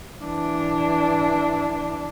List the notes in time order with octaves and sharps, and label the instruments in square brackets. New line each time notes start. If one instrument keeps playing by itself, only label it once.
[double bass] E3 D4